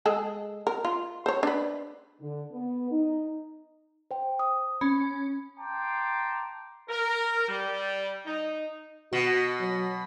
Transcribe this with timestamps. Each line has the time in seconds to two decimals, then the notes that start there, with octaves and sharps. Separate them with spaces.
0.05 G#3 G#4 A4
0.67 A#4
0.85 F4
1.26 C5 C#5
1.43 D4 B4
2.21 D3
2.52 B3
2.91 D#4
4.11 C5 G5
4.39 D#6
4.81 C#4 B5
5.58 G5 A5 A#5 C6 D6
6.89 A#4
7.49 G3
8.26 D#4
9.13 B2 F#4
9.60 F#3